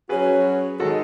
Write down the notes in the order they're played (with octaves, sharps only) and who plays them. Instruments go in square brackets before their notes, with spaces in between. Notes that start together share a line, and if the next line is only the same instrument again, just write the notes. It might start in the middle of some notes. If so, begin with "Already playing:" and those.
[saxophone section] F#3 C#4 F#4 [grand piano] G#4 B4
[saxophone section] D#3 G#3 D#4 [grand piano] F#4 A4